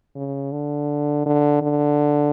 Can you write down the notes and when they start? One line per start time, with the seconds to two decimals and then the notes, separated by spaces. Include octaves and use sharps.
0.16 C#3
0.52 D3
1.26 D3
1.62 D3